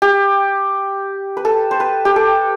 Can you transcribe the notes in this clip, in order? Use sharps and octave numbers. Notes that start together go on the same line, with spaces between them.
G4
B4
A4
C5
B4
G4
A4